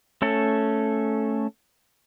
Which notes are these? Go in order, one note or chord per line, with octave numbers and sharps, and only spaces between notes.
A3 C#4 A4